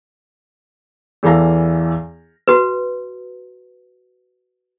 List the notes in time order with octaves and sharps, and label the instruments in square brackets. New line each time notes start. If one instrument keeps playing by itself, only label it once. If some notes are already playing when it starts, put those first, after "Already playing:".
[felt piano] E2 E3 A4 F5 A#5 A#6
[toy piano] F#4 B4